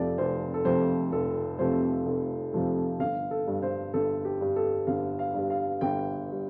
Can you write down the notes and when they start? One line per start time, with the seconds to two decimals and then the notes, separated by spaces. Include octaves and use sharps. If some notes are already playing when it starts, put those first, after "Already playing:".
Already playing: F1 F2 C3 F3 A3 D5
0.18 F1 C5
0.54 A4
0.65 F2 C3 F3 A3 C5
1.12 F1 A4
1.59 F2 C3 F3 A3 C5
2.06 F1
2.53 F2 C3 F3 A3
3.00 G1 F5
3.31 A4
3.47 G2 G3
3.62 C5
3.94 G1 A4
4.25 G4
4.41 G2 G3
4.56 A4
4.87 G1 F5
5.19 F5
5.34 G2 G3
5.50 F5
5.81 G1 G5
6.32 G3